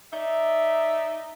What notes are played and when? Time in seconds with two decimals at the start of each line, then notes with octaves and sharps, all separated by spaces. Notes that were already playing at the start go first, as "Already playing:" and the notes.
0.12 D#4 D5 E5